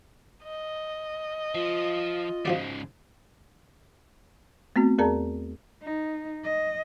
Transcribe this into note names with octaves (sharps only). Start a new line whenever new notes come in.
D#5
F3 F4
G#2 C#3 F3 F#4 D5
A3 B3 C4 F#4
E2 G#4 A#4 D5 A5 A#5
D#4
D#5